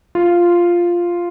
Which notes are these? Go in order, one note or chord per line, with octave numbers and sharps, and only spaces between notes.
F4